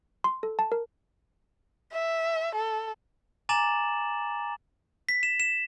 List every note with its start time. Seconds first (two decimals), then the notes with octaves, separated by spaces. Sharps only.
0.24 C6
0.43 A4
0.59 A5
0.72 A#4
1.92 E5
2.55 A4
3.49 G#5 A#5 D6 A6 E7 F#7
5.09 B6
5.23 E7
5.40 E7